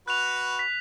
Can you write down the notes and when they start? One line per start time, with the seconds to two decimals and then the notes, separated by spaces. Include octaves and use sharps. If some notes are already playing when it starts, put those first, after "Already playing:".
0.08 F#4 B4 F#6 F7
0.59 B6